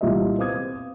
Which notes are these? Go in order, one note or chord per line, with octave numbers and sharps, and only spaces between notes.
C2 A#2 G4 D#5 E5
B3 C4 F5 D6 D#6 G#6